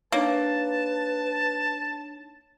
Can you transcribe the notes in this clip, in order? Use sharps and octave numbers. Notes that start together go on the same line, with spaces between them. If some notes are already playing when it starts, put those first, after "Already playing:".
A#3 D4 D#4 B4 C#5 A5